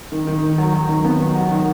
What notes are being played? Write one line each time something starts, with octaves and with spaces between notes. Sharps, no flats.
D#3
D#3
D#3
F#3
F#3
D#3
B3
F#3
F#4
D#3